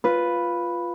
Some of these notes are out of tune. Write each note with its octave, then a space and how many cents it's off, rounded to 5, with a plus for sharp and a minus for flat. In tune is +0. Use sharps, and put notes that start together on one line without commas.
F4 +0 B4 +0